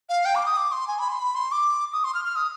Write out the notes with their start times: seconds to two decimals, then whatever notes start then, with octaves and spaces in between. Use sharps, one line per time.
0.09 F5
0.25 G5
0.35 D6
0.46 D#6
0.57 D6
0.72 C6
0.88 G#5
0.99 B5
1.09 C6
1.19 B5
1.35 C6
1.52 D6
1.93 D#6
2.04 C6
2.15 F6
2.25 F6
2.36 D#6